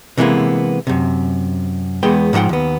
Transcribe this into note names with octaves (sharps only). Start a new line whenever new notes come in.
C3 E3 G#3 A#3 B3
F#2 C3
E2 G#3 B3 G5
G#2 F3 G4 F#5 G5
D#2 B3